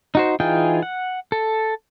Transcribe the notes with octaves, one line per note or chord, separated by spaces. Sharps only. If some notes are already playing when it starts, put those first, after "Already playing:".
D#4 F#4 C5
E3 D#4 F4 G#4 G5
F#5
A4